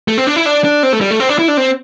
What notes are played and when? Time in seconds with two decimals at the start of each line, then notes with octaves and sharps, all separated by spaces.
0.08 A3
0.18 C4
0.27 D4
0.36 E4
0.46 D4
0.64 D4
0.83 C4
0.93 A3
1.01 G3
1.11 A3
1.20 C4
1.29 D4
1.39 E4
1.48 D4
1.57 C4